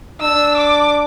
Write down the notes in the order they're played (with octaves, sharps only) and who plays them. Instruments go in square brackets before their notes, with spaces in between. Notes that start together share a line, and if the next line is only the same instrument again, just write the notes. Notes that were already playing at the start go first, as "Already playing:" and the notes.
[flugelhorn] D4 [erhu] E6
[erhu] D6